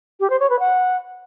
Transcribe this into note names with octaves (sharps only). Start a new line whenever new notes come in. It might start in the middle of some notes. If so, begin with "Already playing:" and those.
G4
C5
C#5
B4
F#5